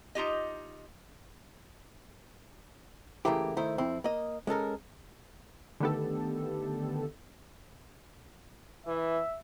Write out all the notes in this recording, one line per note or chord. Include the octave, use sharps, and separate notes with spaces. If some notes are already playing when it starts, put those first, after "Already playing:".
D#4 F4 G4 D#5
C#3 E3 A3 A#3 E4 G4
D#3 A3 E4 C5
F2 C4 E4
A#3 D#5
G#3 C#4 A4 A#4
D3 D#3 A3 B3 G4 A4
E3 E5